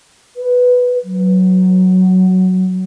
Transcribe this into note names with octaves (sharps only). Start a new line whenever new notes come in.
B4
F#3